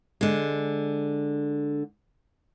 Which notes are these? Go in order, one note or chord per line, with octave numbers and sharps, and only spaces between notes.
D3 G#3